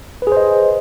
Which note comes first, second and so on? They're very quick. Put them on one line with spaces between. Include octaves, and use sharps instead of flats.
B4 G#4 C5 D#5